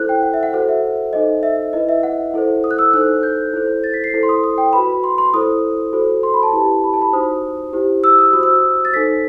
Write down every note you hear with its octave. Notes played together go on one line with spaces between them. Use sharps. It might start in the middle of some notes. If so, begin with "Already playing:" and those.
Already playing: E4 A4 C5 F#6
G5
F#5
E5
F#5
F#4 A4 C5 F#5
E5
D#4 A4 C5 D#5
E5
E4 B4 D#5
E5
F#5
E4 A4 C5
D#6
F#6
E6
D#4 A4 C5 F#6
G6
E4 A4 C5
A6
B6
C7
E4 A4 C5
C6
D#6
D#6
G5
F#4 B4 B5
C6
C6
E4 A4 C5 D#6
F#4 A4 C5
C6
B5
A5
E4 G4 B4
B5
A5
B5
D#4 F#4 C5 D#6
E4 G4 C5
E6
D#6
F#4 C5 D#6
E6
A6
D#4 A4 C5 B6